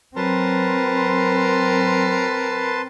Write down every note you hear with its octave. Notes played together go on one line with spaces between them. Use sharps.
F#3 C4 A#4 B4 A5 C6